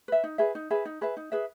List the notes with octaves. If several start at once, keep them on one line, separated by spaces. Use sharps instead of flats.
B4 E5
D#4
G#4 B4 E5
D#4
G#4 B4 E5
D#4
G#4 B4 E5
D#4
G#4 B4 E5